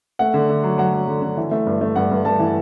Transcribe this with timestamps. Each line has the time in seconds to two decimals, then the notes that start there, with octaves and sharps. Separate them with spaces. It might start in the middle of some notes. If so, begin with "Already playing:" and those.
0.19 A3 F#5
0.34 D3
0.50 D3
0.64 F#3
0.78 F#3 F#5
0.94 F#3
1.08 D3
1.22 D3
1.37 E3
1.51 A3
1.67 G2
1.81 A3
1.96 G2 F#5
2.11 G2
2.25 G2 A5
2.39 E3